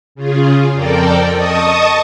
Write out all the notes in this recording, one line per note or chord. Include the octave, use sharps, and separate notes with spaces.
C#3 F4 G#4
F2 A4 A#4 D5 G5
D#5 A5 C#6 D#6